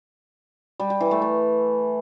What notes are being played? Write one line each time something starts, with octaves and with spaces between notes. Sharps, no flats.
G3
G3
E3
A3
A3